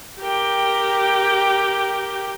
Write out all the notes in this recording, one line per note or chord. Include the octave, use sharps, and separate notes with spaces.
G4 A#4 G5